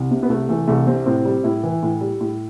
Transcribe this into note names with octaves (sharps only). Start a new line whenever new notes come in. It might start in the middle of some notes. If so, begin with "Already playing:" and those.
Already playing: C2
C3
B3
C2 A3
E3 A3
C2 A3
C3 C4
A2 C4
G3
A2 E4
E3
A2
G3
A2